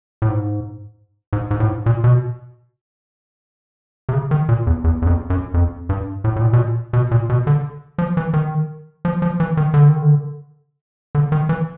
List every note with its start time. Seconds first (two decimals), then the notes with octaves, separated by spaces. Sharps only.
0.22 A2
0.29 G#2
1.33 G#2
1.51 G#2
1.60 A2
1.68 G#2
1.86 A#2
2.04 B2
4.09 C3
4.13 C#3
4.31 D#3
4.49 A#2
4.67 E2
4.84 E2
5.02 E2
5.07 F2
5.30 F#2
5.54 F2
5.89 G2
6.24 A2
6.36 A2
6.41 A#2
6.53 B2
6.58 A#2
6.93 B2
7.11 A#2
7.30 B2
7.47 D3
7.98 F3
8.17 E3
8.34 D#3
9.05 F3
9.22 F3
9.40 E3
9.57 D#3
9.74 D3
9.89 D#3
10.02 D3
11.15 D3
11.32 D#3
11.49 E3